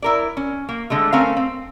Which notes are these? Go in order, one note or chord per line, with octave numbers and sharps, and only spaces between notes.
E4 A#4 D5
C#4
A#3
D3 G#3 A3
A3 C4 C#4 A#4 F5
C4